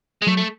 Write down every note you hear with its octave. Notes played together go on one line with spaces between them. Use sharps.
G#3
F#3 A3
A3